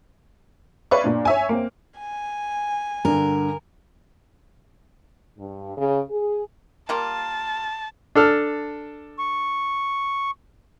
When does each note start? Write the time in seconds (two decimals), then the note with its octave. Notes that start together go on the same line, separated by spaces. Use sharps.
0.91 B4 C#5 D5 E5 F5 C#6
1.04 A#2 D4
1.25 C#5 E5 G#5
1.49 A#3 C4
1.99 G#5
3.05 G2 D3 A#4
5.39 G2
5.78 C#3
6.11 G#4
6.89 G3 A#3 F4 A5
8.15 D4 A4 F6
9.19 C#6